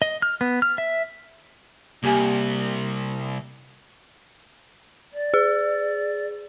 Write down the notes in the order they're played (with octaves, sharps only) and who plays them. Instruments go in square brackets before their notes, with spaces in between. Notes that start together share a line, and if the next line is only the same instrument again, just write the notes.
[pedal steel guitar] D#5
F6
B3
F6
E5
[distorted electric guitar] C2 [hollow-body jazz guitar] A#3 G4 G#5
[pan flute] D5
[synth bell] G#4